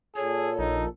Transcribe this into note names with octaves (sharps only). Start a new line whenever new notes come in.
A#2 G#4 A4 C#5
A#1 D#4